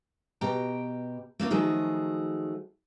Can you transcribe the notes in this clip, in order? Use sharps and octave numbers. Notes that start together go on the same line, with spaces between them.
B2 G4 G5 A#5
A3 A#3 C#4 F4
D#3 F3 F#3 A3 G#4